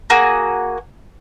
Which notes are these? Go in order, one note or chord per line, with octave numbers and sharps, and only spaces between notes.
A#3 F#4 G#4